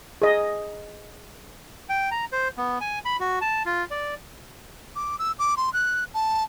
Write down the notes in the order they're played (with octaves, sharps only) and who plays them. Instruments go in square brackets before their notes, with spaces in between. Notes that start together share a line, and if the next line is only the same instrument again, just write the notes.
[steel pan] G#4 D#5
[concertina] G5
A#5
C5
B3
G#5
B5
F#4
A5
F4
D5
[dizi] D6
E6
D6
C6
F#6
A5